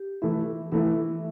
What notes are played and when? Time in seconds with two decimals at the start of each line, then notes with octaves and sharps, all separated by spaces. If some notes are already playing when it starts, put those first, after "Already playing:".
Already playing: G4
0.22 E3 A3 E4 E5
0.72 E3 A3 E4 E5